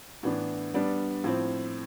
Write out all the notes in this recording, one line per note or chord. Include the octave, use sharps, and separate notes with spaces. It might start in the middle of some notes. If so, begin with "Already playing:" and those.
A2 E3 B3 D4
G3 B3 D4
A2 F3 C4